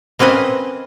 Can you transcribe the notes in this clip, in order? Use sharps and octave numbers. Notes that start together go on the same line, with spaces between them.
A#3 C4 C#4 B4 D#5